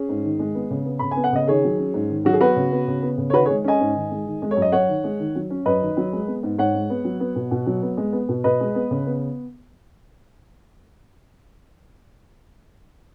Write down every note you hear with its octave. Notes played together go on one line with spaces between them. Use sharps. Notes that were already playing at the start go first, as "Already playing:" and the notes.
Already playing: C#4 G#4
G#2
D#3
G#3
B3
C#3
B3
C#3 B5
G#5
B3
F#5
C#3 D#5
D#3 G#4 C#5
F#3
C#4
G#2
D#3
F#3 F#4
G#4
B3 F#4 B4
C#3
B3
C#3
B3
C#3
C#5
D#3 F#4 B4
G#4 C#5
G#3
C#4 D#5 G#5
G#2
D#3
G#3
D#3
G#3
C#5
F#2
D#5
F#2 C#5 F#5
D#3
G#3
D#3
F#3
C#4
F#2 B4 D#5
D#3
F#3
G#3
B3
G#2
G#2 C#5 F#5
G#3
B3
F#3
B3
B2
B2
F#3
B3
G#3
B3
B2
B2 B4 D#5
G#3
B3
C#3
B3